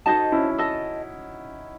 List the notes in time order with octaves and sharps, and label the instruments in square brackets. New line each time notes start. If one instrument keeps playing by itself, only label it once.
[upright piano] D#4 F#4 [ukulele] A4 C5 D#5 A5
[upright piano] C#4 E4
[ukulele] A4 D#5 A5